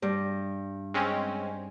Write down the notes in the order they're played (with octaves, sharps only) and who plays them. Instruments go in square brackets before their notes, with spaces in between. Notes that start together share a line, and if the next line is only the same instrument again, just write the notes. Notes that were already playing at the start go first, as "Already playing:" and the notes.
[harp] G2
[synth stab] G#3 C4 C#4